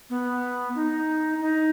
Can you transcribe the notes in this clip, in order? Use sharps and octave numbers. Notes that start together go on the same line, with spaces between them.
B3
D#4
D#4